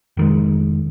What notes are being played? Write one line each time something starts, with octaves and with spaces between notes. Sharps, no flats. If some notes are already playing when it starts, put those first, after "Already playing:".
F1 D#3 G#3